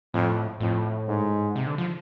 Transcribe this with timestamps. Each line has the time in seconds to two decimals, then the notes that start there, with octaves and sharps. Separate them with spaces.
0.14 F2 A2
0.60 F2 A2
1.08 G#2
1.56 C3
1.67 D3
1.78 F3